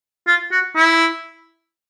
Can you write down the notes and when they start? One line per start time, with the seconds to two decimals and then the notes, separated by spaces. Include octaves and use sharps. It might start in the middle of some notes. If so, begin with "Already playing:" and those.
0.27 F4
0.52 F#4
0.76 E4